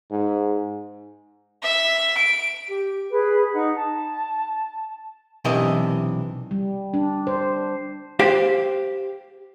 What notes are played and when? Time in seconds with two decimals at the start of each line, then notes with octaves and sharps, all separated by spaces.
0.11 G#2
1.63 E5
2.17 D7
2.69 G4
3.10 G#4 B4
3.53 D#4 F#5
3.75 A5
5.45 B1 C3 E3 D4 A#4 D#5
6.51 G3
6.94 D4
7.27 C5
8.19 G4 C5 F5